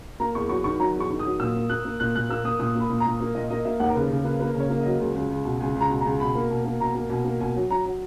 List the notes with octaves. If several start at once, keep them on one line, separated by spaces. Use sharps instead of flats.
A#3 A#5
E2 C#6
F#3 C#6
D#3 C#6
F#3 A#5
E2
C#6
D#3
D#6
F#3
A#2 E6
A#3
A#3 F#6
A#3
A#2 F#6
A#2 F#6
A#3 E6
A#3 D#6
A#2 D#6
A#3 B5
A#2
A#5
A#2
A#3
A#2 D#5
A#3 D#5
A#3 E5
D#2 F#5
A#4
C#3 B4
C#3
A#3 B4
A#3 B4
C#3
C#5
A#3
D#5
F#3
C#2
C#2
C#2
B2
C#2 G#5
C#2
A#5
B2
A#5
C#2
B2 B5
A#3
B2
A#3
B2 A#5
A#3
B2 G#5
A#3
B2 G#5
F#3
F#3 A#5
F#3